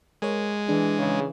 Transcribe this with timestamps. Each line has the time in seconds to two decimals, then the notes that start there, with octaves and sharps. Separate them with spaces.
0.22 G#3 A#4 C#5
0.69 E3 D4 G#4
0.98 C#3